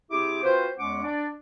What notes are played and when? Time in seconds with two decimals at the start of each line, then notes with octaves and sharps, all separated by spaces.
0.11 C3 C4 E4 G4 G#4 D6
0.43 C4 F4 F#4 B4 C5
0.78 E2 G#3 C#4 F#5 D6
1.04 D4 D5